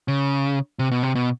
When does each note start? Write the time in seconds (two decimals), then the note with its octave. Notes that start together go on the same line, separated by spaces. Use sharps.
0.08 C#3
0.79 C3
0.91 B2
1.03 C3
1.15 B2